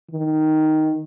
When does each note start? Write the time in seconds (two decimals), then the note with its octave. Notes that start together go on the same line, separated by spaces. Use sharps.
0.11 D#3